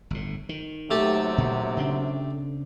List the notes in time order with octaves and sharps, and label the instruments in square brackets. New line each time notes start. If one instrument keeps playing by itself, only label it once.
[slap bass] G1 A2
D#3
[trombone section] D#2 C3 F#3 [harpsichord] A3 G4 A5
[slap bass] A#2
C#3 C4 D4